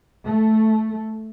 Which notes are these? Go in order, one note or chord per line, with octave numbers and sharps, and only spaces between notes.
A3